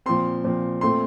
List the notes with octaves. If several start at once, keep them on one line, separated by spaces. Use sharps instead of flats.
A#2 F3 C4 C6
A#2 F3 C4
A#2 A3 C4 C6